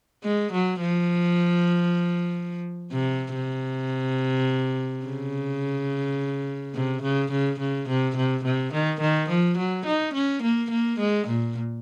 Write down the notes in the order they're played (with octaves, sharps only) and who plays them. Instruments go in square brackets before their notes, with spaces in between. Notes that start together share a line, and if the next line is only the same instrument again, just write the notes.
[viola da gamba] G#3
F#3
F3
C3
C3
C#3
C3
C#3
C#3
C#3
C3
C3
C3
D#3
D#3
F3
F#3
D#4
C#4
A#3
A#3
G#3
A#2